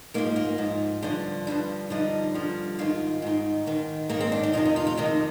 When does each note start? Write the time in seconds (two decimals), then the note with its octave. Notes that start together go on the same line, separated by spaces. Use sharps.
0.14 G#2 A#3
0.18 F3
0.36 A#3
0.58 G#2 F3
1.03 G2 D3 F3
1.47 G2 D3 F3
1.90 G2 D3 F3 D#4
2.34 G2 D3 F3
2.79 G#2 D#3 F4
3.22 G#2 D#3
3.67 G#2 D#3
4.10 G#2 D#3 A#3
4.20 C4
4.32 D4
4.43 D#4
4.53 F2 C3 D#3 F4
4.65 D#4
4.76 F4
4.87 F4
4.97 F2 C3 D#3 D#4